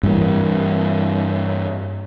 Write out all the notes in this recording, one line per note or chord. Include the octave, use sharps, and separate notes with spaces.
G2 E3 A#3